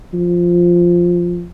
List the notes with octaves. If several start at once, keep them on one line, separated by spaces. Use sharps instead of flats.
F3